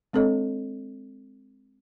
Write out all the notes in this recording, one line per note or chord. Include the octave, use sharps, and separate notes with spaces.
G#3 C4 D4 A4 C#5 D#5